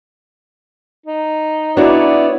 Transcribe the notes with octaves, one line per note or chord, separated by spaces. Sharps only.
D#4
B3 D4 E4 F#4 C#5 D5